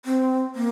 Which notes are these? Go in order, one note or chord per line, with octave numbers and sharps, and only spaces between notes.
C4
A#3